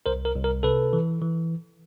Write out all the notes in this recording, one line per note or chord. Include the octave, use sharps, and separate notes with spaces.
C2 A#4 C5
A#4
C2
A#4
C3 A4 B4
E3
E3